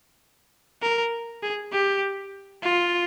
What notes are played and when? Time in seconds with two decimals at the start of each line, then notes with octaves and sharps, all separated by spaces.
0.82 A#4
1.43 G#4
1.72 G4
2.63 F4